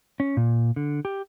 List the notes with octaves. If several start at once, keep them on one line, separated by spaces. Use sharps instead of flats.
C#4
A#2
D3
G4